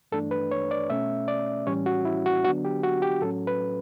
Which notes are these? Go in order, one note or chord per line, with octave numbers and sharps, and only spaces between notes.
G2 E3 A3 D4 A4
B4
C#5
D5
B2 A3 C#4 E5
D5
A2 E3 G3 C#4 C#5
F#4
E4
F#4
D3 F#3 B3 D4 F#4
G4
F#4
G4
A2 F#3 C#4 A4
B4